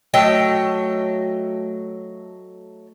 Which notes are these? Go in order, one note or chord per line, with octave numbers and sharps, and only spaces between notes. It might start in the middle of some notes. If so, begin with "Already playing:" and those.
F#3 A3 D#5 G5